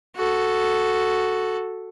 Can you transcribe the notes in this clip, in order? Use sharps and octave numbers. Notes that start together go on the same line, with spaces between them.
F#4 A4